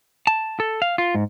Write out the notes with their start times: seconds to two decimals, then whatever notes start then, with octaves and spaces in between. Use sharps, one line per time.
0.27 A5
0.60 A4
0.82 F5
0.98 F4
1.15 G#2